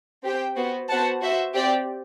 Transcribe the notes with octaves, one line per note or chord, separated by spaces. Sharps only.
C4 G4 C5 G5
B3 F#4 C5
B3 F#4 C5 F#5 A5
F#4 C5 E5
C4 G4 D5 G5